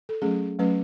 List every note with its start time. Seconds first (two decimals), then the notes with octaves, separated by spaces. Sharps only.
0.09 A4
0.22 F#3 A3 C#4 G#4
0.59 F#3 A3 C#4 B4